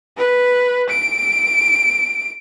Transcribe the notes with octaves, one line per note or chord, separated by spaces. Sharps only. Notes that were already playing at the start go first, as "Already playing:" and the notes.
B4
D7